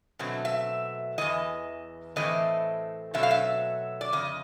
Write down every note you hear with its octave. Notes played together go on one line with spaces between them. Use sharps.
B2 F#3 A3 C4
E5
E2 C#3 E3 D#5
A2 E3 A3 C4 D#5
B2 F#3 A3 C4 E5
F5
E5
D5
F2 C#3 D#5